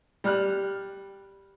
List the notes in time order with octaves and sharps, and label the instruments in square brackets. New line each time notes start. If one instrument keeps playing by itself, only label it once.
[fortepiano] G3 F6 F#6